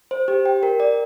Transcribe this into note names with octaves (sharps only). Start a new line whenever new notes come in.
C5
G4
G5
A#4
D5